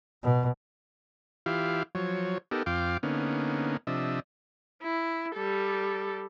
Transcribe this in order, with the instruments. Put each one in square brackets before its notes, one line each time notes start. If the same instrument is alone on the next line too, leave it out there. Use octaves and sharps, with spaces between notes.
[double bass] B2
[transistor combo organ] E3 E4 F4 G4 F5
F3 F#3 C#5
B3 D#4 G4 A4 A#4
F2 F4 F5 G5 D6
D3 A#3 B3 C#4 D#4
C3 F3 D4 D#5 E5
[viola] E4
G3 A4